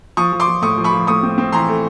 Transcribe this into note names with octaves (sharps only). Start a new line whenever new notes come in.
F3 C#6 D#6
F3
C6 D6
F3
A2 C#6 D#6
F3
B5 C#6
F3
A2 C#6 D#6
C4
C4
E3 A#5 C6
A3